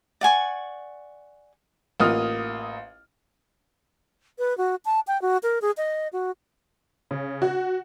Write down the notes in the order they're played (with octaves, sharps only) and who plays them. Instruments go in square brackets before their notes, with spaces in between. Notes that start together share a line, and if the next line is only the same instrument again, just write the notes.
[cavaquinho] D5 F#5 G#5 C#6
[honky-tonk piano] A1 A#3 F4 D#6 F6
[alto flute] B4
F#4
A5
G5
F#4
A#4
G#4
D#5
F#4
[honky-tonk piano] C#3
F#4